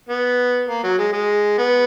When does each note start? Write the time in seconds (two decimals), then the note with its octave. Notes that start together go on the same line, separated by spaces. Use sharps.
0.09 B3
0.69 A#3
0.84 F#3
0.98 G#3
1.13 G#3
1.58 B3